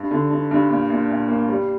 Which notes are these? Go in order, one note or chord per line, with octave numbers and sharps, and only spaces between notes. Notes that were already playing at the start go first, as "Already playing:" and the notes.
Already playing: G2
D3
G2
G2
A#2
A#2
A#2
A#3
G3